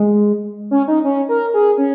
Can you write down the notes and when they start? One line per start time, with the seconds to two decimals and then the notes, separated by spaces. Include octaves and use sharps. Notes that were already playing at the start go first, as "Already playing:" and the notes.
Already playing: G#3
0.71 C#4
0.88 D#4
1.04 C#4
1.29 A#4
1.54 G#4
1.78 C#4